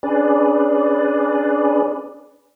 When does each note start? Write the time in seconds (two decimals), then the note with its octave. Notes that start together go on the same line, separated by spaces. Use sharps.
0.03 C#4 D4 G#4 B4 D5